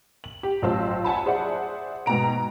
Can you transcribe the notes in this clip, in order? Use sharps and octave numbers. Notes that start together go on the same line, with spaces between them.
F#7
G4
A1 F#3 F4 C5 A5 E6
F#5 G#5 A5 B5
G#4 C5 D5 E5 F#5
G#2 B2 G5 A#5 D7